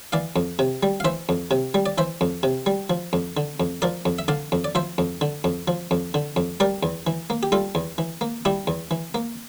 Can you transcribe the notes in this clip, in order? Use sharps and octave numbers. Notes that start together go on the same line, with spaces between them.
E3 D5 F5
F2
C3
G3
F5
E3 C5 E5
F2
C3
G3
D5
E3 C5 E5
F2
C3
G3
F3
F2
D3
F2
F3 A#4 D5
F2
E5
D3 D5 F5
F2
D5
F3 C5 E5
F2
D3
F2
F3
F2
D3
F2
G3 A#4 D5
E2
E3
A#3
G4
G3 F4 A4
E2
E3
A#3
G3 E4 G4
E2
E3
A#3